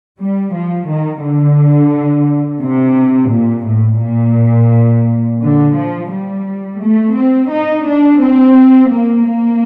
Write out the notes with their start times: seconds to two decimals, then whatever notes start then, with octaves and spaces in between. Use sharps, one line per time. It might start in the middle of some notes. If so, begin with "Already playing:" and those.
0.18 G3
0.53 F3
0.88 D#3
1.22 D3
2.62 C3
3.32 A#2
3.67 A2
4.01 A#2
5.42 D3
5.76 F3
6.11 G3
6.81 A3
7.15 C4
7.51 D#4
7.85 D4
8.20 C4
8.90 A#3
9.25 A#3